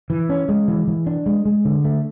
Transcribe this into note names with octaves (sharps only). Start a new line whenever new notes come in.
E3
C#4
G#3
E3
E3
D4
G#3
G#3
D3
A3